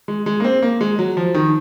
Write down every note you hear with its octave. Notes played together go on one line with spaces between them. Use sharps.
G#3
G#3
A#3
C4
A#3
G#3
F#3
F3
D#3